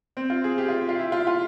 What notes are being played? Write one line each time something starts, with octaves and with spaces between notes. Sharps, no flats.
C4
F4
G#4
G4
F4
F4
E4
F4
F4